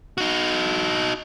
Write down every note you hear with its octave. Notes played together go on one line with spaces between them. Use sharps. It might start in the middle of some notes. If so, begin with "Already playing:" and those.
D#4 F#4